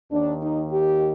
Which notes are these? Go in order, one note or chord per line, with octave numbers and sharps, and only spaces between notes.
D#2 D#3 D4
D#4
G4